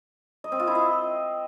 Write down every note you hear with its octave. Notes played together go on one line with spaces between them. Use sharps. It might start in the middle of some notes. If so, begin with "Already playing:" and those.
D#5
C4
F4
E4
D#5